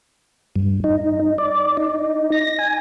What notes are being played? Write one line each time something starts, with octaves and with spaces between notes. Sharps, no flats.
G2
D#4
D5
D#4
A#6
G#5